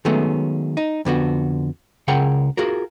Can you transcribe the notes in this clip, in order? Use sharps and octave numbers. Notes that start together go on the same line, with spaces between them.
D#3 F#3 G#3 A3 B3 C#4
D#4
F2 D3 B3 F#4
C#2 C#3 G#4 A#4 F#5 G5
F4 F#4 G#4 A#4